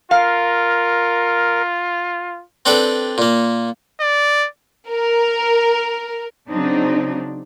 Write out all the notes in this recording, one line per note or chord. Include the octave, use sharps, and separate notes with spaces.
F4 A#4 F5
C4 D4 A4 B4 G5
A#2 A#3
D5
A#4
C#3 F#3 C4 D4 D#4